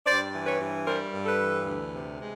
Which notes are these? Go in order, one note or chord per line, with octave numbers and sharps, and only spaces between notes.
G2 C5 D5
E3
B4 C#5
G2
G3 A#4 C5
G2
A4 B4
E3
D2
C3
G#3